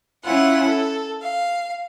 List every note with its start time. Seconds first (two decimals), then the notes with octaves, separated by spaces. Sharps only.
0.24 C#4 E4 F4 F#5
0.66 A4
1.21 F5